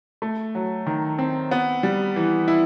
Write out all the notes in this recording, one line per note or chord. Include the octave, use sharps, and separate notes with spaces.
A3
F#3
D#3
C4
B3
G3
E3
E4